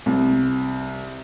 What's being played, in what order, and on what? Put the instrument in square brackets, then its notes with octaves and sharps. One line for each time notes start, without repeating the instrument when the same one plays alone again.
[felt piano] C2